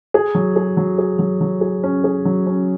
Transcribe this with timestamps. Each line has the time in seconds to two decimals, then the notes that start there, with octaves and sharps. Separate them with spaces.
0.14 G#4
0.35 F#3
0.56 G#4
0.77 F#3
0.98 G#4
1.19 F#3
1.41 F#3
1.61 G#4
1.84 C#4
2.04 G#4
2.25 F#3
2.46 C#4